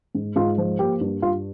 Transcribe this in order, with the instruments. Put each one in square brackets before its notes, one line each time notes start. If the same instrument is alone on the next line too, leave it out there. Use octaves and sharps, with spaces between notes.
[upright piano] G#2
G#2 F4
F3
A#3 G4
G2
G2 F4